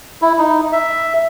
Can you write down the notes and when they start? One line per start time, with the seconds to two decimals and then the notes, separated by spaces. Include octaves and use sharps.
0.22 E4
0.39 D#4
0.73 E5